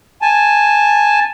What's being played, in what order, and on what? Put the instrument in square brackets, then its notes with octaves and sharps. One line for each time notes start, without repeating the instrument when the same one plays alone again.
[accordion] G#5 A5